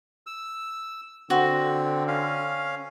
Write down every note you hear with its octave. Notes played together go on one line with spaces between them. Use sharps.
E6
D3 C4 F#4
C#4 F5